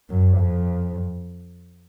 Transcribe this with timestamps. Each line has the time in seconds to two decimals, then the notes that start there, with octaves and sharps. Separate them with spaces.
0.10 F#2
0.38 F2